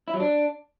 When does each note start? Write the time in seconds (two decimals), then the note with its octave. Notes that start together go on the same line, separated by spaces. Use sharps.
0.08 E4
0.14 F#3
0.20 D4